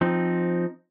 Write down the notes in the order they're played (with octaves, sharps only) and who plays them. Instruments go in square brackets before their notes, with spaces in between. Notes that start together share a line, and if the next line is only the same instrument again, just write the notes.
[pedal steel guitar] F3 C4 D#4